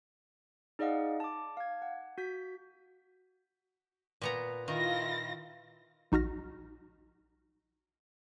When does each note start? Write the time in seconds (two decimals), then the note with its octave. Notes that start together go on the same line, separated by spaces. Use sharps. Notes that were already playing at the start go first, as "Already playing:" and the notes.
0.79 D#4 G#4 D5 D#5 F5 F#5
1.20 A5 D6
1.57 F5 G#6
1.82 F#5
2.18 F#4 G6 B6
4.22 A#2 B3 A#5
4.68 D#3 E4 F4 A#6
6.12 A#1 D#4 F#4 F6 A#6